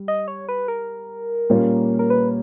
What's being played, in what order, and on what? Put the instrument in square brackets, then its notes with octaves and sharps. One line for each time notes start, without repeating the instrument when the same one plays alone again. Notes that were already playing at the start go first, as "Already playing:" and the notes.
Already playing: [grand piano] G3
[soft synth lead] D#5
C#5
B4
A#4
[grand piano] A#2 G3 A#3 C#4 F4
[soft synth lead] A#4
B4